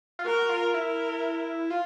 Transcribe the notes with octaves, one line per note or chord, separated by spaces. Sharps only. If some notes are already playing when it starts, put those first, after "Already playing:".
F4
F#4 A#4
F4
E4 A#4
F4